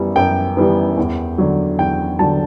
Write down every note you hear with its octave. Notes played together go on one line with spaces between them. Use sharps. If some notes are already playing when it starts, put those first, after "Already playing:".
Already playing: F#2 E3 G3 B3
F#2 G5
E3 G3 B3
E2
D3 F#3
E2 G5
D3 F#3 A5